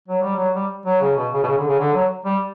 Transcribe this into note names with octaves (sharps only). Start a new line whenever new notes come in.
F#3
G3
F#3
G3
F#3
C#3
B2
C#3
B2
C#3
D3
C#3
D3
F#3
G3